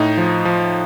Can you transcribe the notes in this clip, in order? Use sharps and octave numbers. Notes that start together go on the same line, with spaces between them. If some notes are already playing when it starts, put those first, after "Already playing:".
Already playing: A2 D#4
F3
F3